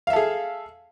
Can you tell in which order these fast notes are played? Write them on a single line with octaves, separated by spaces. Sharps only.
F5 E5 A4 G#4